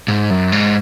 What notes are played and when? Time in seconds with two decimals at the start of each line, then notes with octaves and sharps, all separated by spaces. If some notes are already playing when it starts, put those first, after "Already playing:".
0.08 G#2
0.30 F#2
0.52 G#2